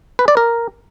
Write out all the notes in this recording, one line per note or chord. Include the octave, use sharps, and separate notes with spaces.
B4
D5
A#4